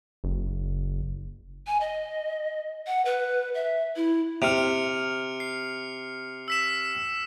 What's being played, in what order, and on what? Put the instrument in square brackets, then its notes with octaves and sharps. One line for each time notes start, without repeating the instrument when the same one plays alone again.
[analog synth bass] F#1
[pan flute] G#5
D#5
F#5
B4
E5
E4
[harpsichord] C3 [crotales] F6 C#7 F7
[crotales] C7
E6 B6 E7